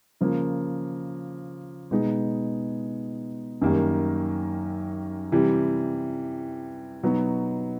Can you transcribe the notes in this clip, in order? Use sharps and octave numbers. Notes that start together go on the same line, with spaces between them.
C#3 F3 A#3
B2 G#3 B3 D#4 G#4
F#2 D#3 G3 A#3
C3 E3 G3
B2 F#3 B3 D#4 F#4